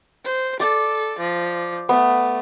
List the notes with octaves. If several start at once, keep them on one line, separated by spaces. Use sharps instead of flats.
C5
A4 D5
F3
A3 B3